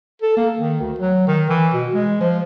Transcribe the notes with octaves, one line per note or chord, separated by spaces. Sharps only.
A4
A#3
D#3
D2
F#3
D#3
E3
B2
G#3
F3